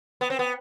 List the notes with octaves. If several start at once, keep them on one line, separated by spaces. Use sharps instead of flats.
B3
C4
B3